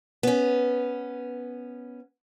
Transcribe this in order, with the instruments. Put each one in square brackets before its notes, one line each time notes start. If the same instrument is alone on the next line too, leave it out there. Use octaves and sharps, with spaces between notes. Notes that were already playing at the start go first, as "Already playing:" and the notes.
[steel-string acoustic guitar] B3 C#4